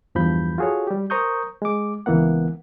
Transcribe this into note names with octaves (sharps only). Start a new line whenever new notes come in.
E2 G2 F3 B5 G6
F4 F#4 G#4 A4 C#5
G3 G4
A#4 C5 A#5 C#6 D#6 G6
G#3 D6
C#2 E3 A#3 B3 F#5